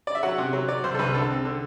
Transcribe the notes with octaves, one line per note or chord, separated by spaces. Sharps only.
D5
E5
F#3 F#5
C3
F#3
F#3 D5
C2 C5
A4
C2 B4
D3 A4
C4
D3